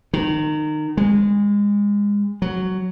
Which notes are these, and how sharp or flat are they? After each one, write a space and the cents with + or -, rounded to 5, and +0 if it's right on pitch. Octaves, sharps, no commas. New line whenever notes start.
D#3 -25
G#3 -25
F#3 +5